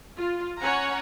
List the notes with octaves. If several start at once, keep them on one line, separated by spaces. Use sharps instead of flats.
F4
C#4 C#5 F#5 G#5 A#5